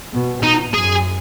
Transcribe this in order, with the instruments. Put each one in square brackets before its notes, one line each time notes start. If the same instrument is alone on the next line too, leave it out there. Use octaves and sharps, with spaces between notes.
[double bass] B2
[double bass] B2 [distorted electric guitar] D#4
[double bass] F#2 [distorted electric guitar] G#4